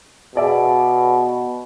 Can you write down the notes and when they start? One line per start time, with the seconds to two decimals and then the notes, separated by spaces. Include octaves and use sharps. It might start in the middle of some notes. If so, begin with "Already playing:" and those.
0.35 B2 G#4 D5 E5